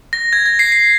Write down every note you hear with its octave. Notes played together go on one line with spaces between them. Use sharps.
A#6
G#6
A#6
C7
C7